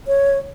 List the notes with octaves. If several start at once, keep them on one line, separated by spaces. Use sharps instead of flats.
C#5